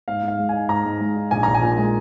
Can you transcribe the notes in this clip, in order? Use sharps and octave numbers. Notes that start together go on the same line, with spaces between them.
G#2 F5
G#2 F5
G#3
D#4 G#5
G#2 A#5
G#2
G#3
D#4
A#1 G#5
A#1 A#5
G#5
A#2
G#3